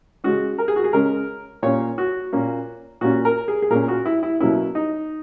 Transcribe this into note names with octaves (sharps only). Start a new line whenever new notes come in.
C#3 G#3 C#4 F#4
A#4
G#4
F#4
G#4
C#3 G#3 C#4 A#4
A#2 A#3 C#4 C#5
F#4
A#2 A#3 C#4
A#2 A#3 C#4 F#4
A#4
G#4
G#4
A#2 A#3 C#4 A#4
F#4
E4
E4
B2 F#3 A#3 C#4 E4
D#4